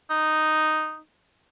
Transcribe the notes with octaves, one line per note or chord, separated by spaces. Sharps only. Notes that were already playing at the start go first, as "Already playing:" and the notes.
D#4